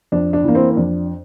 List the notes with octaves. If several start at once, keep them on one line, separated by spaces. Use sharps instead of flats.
F2 D4
D4
E3 A#3
C4 E4
C4
F2 D4